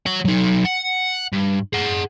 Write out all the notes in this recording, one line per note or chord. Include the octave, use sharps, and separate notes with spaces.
C#5 F#5
F#3 D#4
F#5
G2
G#4 F#5